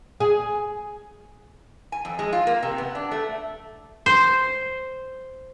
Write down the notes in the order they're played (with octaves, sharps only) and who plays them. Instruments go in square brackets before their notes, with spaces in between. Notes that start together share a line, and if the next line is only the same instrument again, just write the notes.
[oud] G#4
[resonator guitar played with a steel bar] G#5
F2
G#3
F4
A#3
C3
B3
D4
A3
[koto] C5